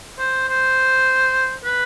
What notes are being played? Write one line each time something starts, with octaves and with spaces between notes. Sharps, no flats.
C5
C5
B4